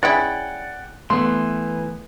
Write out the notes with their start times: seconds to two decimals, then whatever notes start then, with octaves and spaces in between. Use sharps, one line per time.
0.03 G#3 C#4 E4 D5 F#5 G5
1.10 E3 A3 B3 C6